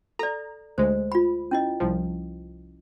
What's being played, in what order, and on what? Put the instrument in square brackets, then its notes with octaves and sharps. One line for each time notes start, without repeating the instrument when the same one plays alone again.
[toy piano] A4 D5 [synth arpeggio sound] A#5
[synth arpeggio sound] D2 G#3 [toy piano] C5
[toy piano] F4 B5
C#4 E4 D#5
[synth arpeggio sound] C2 F3